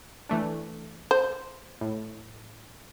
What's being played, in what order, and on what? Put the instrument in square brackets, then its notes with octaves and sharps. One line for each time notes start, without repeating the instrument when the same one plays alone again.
[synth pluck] E3 A3 D4
[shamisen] C5
[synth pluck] A2